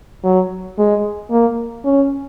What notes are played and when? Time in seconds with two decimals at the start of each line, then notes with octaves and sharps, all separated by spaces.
0.24 F#3
0.78 G#3
1.30 A#3
1.85 C#4